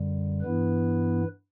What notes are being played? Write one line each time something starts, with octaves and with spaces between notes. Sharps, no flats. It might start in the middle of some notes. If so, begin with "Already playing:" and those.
Already playing: F#2 D3 G3
G2 E3 B3 E4 B4